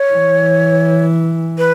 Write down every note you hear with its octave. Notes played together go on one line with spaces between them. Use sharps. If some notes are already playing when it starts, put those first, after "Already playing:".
Already playing: C#5
E3
B4